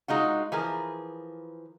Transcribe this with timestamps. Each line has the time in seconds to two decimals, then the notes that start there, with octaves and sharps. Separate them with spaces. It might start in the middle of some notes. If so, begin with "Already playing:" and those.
0.08 G#3 D#4 F4 F#4
0.52 E3 F3 G#4 A#4